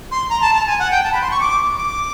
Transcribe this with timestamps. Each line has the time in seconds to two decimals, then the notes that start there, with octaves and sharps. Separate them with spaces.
0.12 C6
0.30 A#5
0.42 A5
0.55 A5
0.67 G#5
0.79 F#5
0.91 G5
1.04 A5
1.12 B5
1.22 C6
1.31 C#6
1.40 D6
1.77 D6